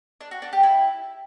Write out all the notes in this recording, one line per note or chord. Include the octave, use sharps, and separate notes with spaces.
D4
F#4
D4
G4
E4